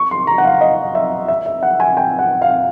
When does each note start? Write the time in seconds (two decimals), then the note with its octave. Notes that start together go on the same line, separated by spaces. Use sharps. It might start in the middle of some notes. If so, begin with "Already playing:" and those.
Already playing: C#6
0.11 C6
0.27 A#5
0.38 F#5
0.45 F5
0.61 D#5
0.95 E5
1.28 E5
1.46 E5
1.63 F#5
1.80 G#5
1.97 G5
2.19 F#5
2.42 F5